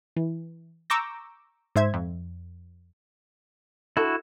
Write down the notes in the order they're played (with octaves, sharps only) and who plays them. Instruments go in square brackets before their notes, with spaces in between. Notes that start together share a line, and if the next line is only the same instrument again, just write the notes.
[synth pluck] E3
A#5 C#6 D6 E6 G6 A#6
G#2 C5 E5 G#6
F2
[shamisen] D3 A4 D#5 [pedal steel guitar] E4 F#4